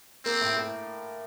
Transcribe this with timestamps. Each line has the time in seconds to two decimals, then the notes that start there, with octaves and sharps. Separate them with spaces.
0.25 A#3 C4
0.41 A2
0.56 A2